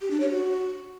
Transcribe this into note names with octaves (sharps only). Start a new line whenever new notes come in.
G4
D4
C#5
F#4